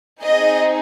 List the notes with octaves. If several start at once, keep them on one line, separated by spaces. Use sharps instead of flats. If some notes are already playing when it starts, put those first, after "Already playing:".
C4 D#4 G#4 D#5